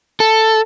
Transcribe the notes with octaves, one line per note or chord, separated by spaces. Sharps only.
A4